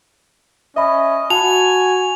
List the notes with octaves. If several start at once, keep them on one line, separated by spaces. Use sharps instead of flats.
C#4 D#5 E5 B5
F#4 G#5 A5 B5 F7